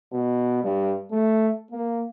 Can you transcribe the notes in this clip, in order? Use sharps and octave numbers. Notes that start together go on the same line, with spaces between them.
B2
G2
A3
A#3